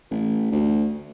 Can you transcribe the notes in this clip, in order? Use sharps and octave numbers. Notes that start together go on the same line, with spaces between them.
A1
D2